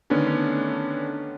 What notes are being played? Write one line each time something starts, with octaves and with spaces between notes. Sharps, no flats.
D3 D#3 A3 B3 C#4 D4